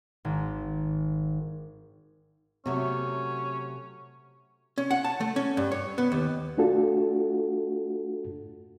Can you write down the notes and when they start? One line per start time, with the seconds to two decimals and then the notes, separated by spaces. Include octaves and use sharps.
0.25 G#1
2.66 C3 F#3 A3 C#4
4.78 C#4
4.91 F#5
5.05 A5
5.21 A3
5.36 C#4
5.57 G2
5.72 C#5
5.98 B3
6.12 D#2
6.58 A3 D4 F4 F#4 A4